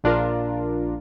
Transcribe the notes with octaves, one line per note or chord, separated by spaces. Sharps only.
A#1 D4 F4 A#4